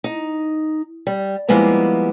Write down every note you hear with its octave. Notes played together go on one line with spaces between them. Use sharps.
D#4
G3
F3 G3 G#3 A#3 B3 E4